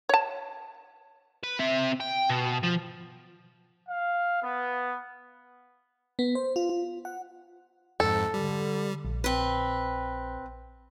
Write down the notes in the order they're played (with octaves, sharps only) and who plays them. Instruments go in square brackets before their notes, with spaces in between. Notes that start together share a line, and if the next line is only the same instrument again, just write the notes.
[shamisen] C#5 A5
[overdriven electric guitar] B4
C4 E5
G5
B2
F3
[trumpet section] F5
B3
[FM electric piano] B3
C5
F4
F4
F#5
[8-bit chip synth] F2 G#2 [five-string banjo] A4
[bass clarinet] D3 [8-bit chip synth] G3
[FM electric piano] A#1
[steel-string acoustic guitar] C4 B4